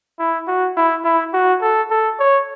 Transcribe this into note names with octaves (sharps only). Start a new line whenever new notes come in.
E4
F#4
E4
E4
F#4
A4
A4
C#5